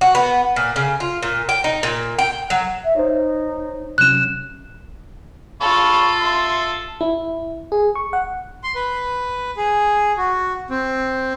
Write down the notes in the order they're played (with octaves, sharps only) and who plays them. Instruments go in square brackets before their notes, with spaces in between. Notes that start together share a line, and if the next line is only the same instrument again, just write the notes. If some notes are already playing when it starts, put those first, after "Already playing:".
[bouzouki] F#4
B3
A#2
C#3
F4
A#2
G5
D#4
A#2
G5
F#3
[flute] E5
[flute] D#4 [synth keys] C5 C#5
[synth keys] C3 F#3 C#4 [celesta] F#6 E7
[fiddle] F4 A4 [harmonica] F5 B5 C#6
[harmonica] E5 C6
[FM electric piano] E4
G#4
C#6
F#5
[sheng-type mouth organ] C6
B4
G#4
F#4
C4